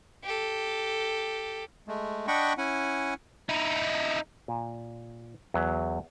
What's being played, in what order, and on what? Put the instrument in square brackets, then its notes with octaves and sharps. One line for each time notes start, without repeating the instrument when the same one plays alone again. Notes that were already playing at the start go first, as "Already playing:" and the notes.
[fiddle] G4 A4
[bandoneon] G#3 A3
D4 D#5 F#5 G5 B5 C#6
C#4 E4 F#5 G#5
[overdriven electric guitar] D#4 E4
[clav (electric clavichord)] A#2
E2 F#3 E5